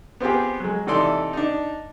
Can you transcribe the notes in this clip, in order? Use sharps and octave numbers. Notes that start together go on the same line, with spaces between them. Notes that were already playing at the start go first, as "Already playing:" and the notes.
B3 C4 F4 G4 G#4
F#3 G#3
C3 E3 D#4 A4 D5 C6
D4 D#4